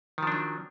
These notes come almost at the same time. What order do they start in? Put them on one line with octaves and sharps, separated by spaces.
D#3 F3 D4 F#3